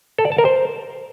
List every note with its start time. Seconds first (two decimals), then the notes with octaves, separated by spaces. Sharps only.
0.18 A4
0.25 D5
0.32 A5
0.38 A#4
0.45 C5